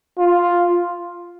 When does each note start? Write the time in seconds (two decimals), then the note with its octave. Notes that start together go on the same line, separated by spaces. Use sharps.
0.19 F4